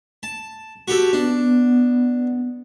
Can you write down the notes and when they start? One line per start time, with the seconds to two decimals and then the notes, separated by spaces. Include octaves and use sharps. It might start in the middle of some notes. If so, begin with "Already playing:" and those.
0.23 A5
0.88 F#4 G4 A4
1.13 B3 D4